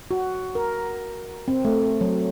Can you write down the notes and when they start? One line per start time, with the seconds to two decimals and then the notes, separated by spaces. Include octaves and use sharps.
0.11 F#4
0.55 A#4
1.48 C4
1.65 A3
2.01 F#3